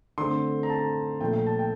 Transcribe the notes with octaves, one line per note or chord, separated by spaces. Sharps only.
D3 A3 C4 C6
A#5
A5
A#2 F3 A3 G5
G5
A5
G5